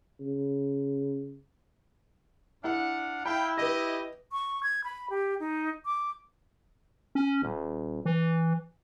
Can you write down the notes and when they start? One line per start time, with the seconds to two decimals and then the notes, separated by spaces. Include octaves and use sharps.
0.20 C#3
2.64 D4 E4 F5 F#5
3.26 E4 F5 G5 B5
3.58 G4 B4 D#5 A#6
4.32 C#6
4.63 G#6
4.84 B5
5.10 G4
5.40 D#4
5.86 D6
7.15 C#4
7.42 D#1
8.05 E3